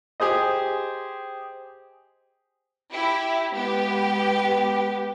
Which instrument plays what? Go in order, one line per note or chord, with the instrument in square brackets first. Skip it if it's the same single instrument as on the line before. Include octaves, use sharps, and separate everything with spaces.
[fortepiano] G4 G#4 C5 D#5
[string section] E4 G4
G#3 B3 G4